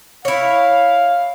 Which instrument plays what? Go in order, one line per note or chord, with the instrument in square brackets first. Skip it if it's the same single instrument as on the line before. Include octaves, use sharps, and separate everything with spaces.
[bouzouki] E4 C#5 [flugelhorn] F5